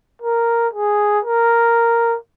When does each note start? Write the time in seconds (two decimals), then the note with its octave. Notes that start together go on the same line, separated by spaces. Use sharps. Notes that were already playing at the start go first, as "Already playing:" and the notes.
0.22 A#4
0.73 G#4
1.25 A#4